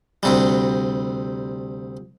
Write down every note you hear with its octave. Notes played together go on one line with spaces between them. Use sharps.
D2 C3 G3